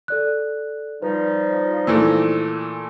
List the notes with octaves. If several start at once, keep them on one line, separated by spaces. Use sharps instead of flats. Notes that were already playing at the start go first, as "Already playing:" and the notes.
A4 D5 F#6
F3 G3 D#4 B4
A#2 E3 A3 E6